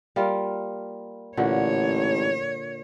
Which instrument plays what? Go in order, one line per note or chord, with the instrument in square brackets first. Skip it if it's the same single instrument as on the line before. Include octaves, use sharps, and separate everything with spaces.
[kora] G3 A#3 F4
[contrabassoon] A1 [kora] A#2 D3 F#4 [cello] C#5